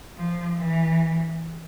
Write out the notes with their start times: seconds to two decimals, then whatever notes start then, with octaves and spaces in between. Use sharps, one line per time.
0.17 F3
0.58 E3